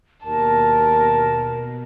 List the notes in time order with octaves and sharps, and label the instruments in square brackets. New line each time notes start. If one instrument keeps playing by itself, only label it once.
[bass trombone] D#2 [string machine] B2 [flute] A#4 [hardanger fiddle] A5